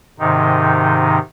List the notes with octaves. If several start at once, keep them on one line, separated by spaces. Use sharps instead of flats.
G#2 C3 D#3 D#4